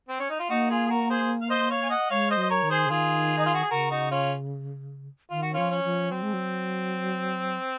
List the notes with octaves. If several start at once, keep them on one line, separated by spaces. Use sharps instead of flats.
C4
C#4
D#4
F4
A#3 D#4 F#4
F4 G#4
G#4
F#4 A#4
G#4 C5
F5
C5 D#5
C#5 F5
G#5
D#5 F#5
G#3 C#5 F5
C5 D#5
F#3
D#5
A#4 C#5
D#3
G#4 C5
C#3
D#3 F4 G#4
D#4
F4
F#4
G#4
C#3 F#4 A#4
D#4 F#4
C#4 F4
D#3 F4
F#4
F3 C#4 F4
C#4
F3
F#3 C4
G#3
F#3